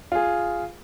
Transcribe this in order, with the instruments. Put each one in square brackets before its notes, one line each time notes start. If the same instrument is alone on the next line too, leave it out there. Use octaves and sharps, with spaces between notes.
[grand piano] F4 G#4